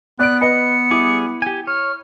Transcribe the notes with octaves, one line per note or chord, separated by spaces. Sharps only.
B3 D5 F#6 D7
B4 D#5 C#7
G3 E4 G#4 D6
G4 G#5
C#5 F6